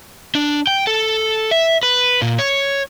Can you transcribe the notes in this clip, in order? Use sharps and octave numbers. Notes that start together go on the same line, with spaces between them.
D4
G5
A4
E5
B4
A#2
C#5